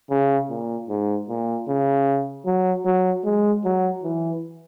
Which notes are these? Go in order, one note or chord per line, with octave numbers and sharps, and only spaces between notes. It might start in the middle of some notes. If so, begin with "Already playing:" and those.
C#3
A#2
G#2
A#2
C#3
F#3
F#3
G#3
F#3
E3